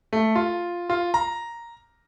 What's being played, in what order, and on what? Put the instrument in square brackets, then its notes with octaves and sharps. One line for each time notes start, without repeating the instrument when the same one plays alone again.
[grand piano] A3
F4
F4
A#5